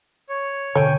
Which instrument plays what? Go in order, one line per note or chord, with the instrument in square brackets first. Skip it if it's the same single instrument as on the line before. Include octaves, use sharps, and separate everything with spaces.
[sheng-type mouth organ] C#5
[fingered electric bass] B2 D3 [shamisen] A4 C#5 [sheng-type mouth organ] G5 G#5